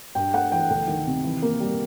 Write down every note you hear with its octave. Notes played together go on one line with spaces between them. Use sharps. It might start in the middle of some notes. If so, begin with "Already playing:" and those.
G2 G5
A3 F#5
E3 G5
D2 G5
D#3
C3
E3
A#3
G3